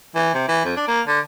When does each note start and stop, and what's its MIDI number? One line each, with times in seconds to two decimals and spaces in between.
0.15 0.34 52
0.34 0.45 48
0.48 0.62 52
0.65 0.75 41
0.77 0.83 62
0.88 1.01 58
1.07 1.19 50